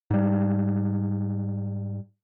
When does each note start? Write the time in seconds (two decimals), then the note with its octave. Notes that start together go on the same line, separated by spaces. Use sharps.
0.11 G#2 G3